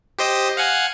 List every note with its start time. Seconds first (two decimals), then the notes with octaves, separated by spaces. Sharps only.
0.19 G4 C5 D#5
0.57 F5 F#5 G#5